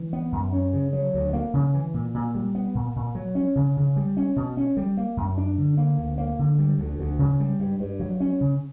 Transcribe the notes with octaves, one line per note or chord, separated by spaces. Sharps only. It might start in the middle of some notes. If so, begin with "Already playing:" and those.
Already playing: E3
B3
F#2
C#4
C#3
F#3
D2
A#3
C#3
E3
A#2
A#2
G3
B3
A#2
A#2
F#3
C#4
C#3
C#3
G3
C#4
B2
C#4
G3
A#3
F#2
D4
D3
A#3
D2
A#3
D3
G3
D2
D2
C#3
G3
G2
G2
F#3
C#4
C#3